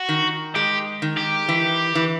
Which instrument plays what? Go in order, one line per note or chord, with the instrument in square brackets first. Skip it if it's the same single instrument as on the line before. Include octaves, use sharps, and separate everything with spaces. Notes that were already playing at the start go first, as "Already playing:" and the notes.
Already playing: [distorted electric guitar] F#4
[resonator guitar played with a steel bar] D#3
[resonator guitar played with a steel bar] G#3 [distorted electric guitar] G4
[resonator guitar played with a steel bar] D#3
[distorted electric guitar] G4
[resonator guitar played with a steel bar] E3
E3